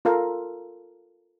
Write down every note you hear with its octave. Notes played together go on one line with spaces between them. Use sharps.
F4 A4 A#4 F5